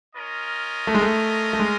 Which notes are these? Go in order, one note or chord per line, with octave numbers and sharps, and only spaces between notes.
C#4 F4 A#4 D#5
A3
G#3
A3
A3
G#3